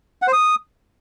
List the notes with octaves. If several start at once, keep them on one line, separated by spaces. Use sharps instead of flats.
F#5
C5
D#6